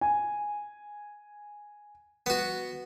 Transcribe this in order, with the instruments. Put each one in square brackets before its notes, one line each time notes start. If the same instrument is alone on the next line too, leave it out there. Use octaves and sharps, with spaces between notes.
[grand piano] G#5
[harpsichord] B3 F#4